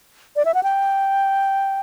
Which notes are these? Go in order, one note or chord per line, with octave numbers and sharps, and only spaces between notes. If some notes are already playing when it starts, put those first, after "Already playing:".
D5
E5
F#5
G5